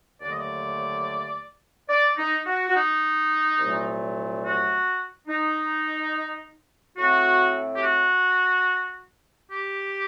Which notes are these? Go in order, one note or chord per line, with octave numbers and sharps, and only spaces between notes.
D#2 D3 F#3 A3 D5
D#5
D5
D5
D#4
F#4
F#4
D#4
C2 A#2 F#3 A3
F#4
D#4
A2 A3 C4 F#4
G4
F#4
G4